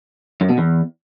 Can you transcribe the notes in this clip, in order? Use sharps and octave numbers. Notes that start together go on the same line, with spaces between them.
F#2
B2
E2